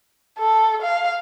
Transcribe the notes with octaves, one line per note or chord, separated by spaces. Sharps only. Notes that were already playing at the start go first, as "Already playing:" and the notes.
A4
F5